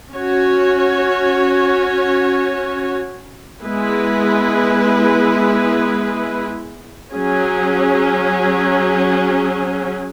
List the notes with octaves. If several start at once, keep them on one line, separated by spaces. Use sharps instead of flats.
C#4 F#4 C#5
G#3 B3 E4 G#4 B4
F#3 C#4 G#4